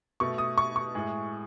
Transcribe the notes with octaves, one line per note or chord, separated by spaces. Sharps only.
B2 A3 C#6
D#6
C#6
C#6
A2 G#3